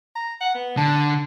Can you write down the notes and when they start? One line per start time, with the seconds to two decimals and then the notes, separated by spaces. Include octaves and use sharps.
0.15 A#5
0.41 F#5
0.55 B3
0.77 D3 A5